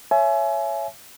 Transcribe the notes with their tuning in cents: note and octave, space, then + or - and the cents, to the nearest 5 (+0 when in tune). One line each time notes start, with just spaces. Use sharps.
C#5 +0 E5 +20 G#5 +30